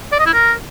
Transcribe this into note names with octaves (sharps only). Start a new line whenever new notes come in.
D5
D#5
E4
A#4